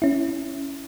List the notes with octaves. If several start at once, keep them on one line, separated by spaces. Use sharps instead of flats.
C#4 E4